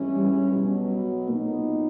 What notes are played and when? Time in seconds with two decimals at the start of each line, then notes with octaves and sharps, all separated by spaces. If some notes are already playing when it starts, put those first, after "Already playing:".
Already playing: A1 G2 E3 G#3 C#4
0.16 G3
0.53 B1 B2 F#3 G3
1.28 B1 A#2 F#3 A#3 B3 D#4